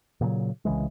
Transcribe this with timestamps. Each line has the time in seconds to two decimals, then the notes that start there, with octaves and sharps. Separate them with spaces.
0.21 A#2 C#3 E3 F#3
0.65 C2 C#3 E3 G#3